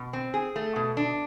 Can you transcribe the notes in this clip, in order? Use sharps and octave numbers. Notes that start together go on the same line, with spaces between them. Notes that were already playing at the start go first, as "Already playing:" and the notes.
Already playing: B2
C4
G#4
A3
B2
D4